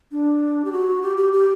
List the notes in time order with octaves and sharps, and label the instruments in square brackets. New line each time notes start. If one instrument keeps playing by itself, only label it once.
[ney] D4
G4
F#4
G4
G4
G4